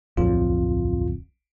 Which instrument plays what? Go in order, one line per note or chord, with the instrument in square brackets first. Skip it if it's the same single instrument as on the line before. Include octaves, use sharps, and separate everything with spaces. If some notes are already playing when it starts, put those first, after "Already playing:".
[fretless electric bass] D1 F2 [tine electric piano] B1 F4